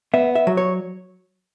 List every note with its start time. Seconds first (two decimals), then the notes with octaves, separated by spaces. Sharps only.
0.14 B3 E5
0.35 E5
0.47 F#3
0.57 C#5